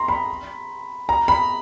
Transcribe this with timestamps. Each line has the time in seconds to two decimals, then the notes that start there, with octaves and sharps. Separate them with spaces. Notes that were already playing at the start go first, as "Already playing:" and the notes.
Already playing: A#5 C6
0.08 B5
1.09 A#5
1.28 B5